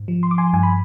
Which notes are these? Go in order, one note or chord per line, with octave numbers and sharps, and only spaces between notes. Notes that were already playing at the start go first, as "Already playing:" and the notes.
Already playing: G#2
F3
C6
D6
G#5 C6
G2 G#5
B5